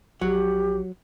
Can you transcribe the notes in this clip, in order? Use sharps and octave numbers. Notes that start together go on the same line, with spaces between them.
A#1 F#3 G4